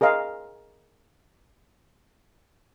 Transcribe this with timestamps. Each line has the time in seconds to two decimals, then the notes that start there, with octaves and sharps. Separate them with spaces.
0.01 G#4 A#4 D#5 F5